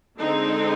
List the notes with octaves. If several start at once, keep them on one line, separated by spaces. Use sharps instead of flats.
D3 G#3 C4 D#4